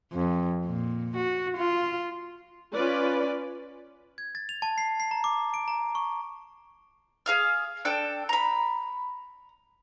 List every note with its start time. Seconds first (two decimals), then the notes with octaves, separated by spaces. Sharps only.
0.13 F2
0.65 A#2
1.17 F#4
1.57 F4
2.73 C#4 F4 B4 D5
4.18 G#6
4.35 A6
4.49 F7
4.62 A5
4.78 C7
5.00 C7
5.11 A#5
5.24 D6
5.54 D7
5.68 A#5
5.95 C#6
7.26 G#4 F5 F6
7.85 D4 A4 G5
8.29 A#5 B5